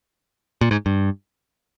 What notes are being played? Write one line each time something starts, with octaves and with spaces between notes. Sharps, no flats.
A#2
G#2
G2